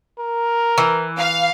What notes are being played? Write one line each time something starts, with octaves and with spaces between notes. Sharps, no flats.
A#4
E3
F5